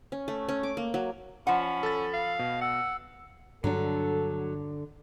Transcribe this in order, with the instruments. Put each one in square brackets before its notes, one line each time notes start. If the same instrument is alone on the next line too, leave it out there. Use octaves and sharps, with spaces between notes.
[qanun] C#4
A3
C#4
D6
A#3
F#3
[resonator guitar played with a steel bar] F3 F#5 [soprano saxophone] C#4 [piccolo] B5
[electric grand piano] A4 A6
[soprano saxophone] F5
[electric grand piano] B2
[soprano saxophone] F#5 [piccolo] E6
[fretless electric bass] G2 D4 [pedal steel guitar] D3 [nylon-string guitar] F#3 [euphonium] A4